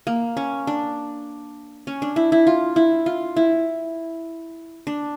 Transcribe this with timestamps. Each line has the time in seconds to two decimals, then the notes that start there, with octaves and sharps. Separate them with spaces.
0.07 A#3
0.37 C#4
0.67 D4
1.87 C#4
2.02 D4
2.16 E4
2.32 E4
2.47 F4
2.76 E4
3.06 F4
3.36 E4
4.87 D4